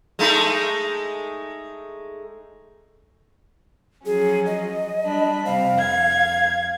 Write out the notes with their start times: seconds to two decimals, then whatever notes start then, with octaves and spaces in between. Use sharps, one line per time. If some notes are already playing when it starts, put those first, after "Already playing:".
0.19 G#3 A3 D#4
4.06 F3 F#3 C#4 G#4
4.46 D#5
5.03 G3 D4 B5
5.45 C3 C4 F5
5.77 F2 G#6